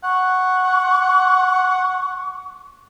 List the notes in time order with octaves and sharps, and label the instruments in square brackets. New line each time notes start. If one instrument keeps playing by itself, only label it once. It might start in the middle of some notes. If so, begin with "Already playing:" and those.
[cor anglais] F#5 [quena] C#6